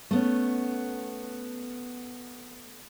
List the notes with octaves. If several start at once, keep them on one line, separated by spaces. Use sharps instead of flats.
A3 B3 C#4